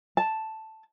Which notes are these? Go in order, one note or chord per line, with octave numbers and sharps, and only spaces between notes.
A5